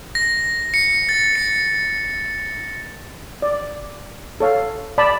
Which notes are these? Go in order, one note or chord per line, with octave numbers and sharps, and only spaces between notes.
A#6
C#7
A6
C#7
D5
A4 C#5 F5
D5 A5 B5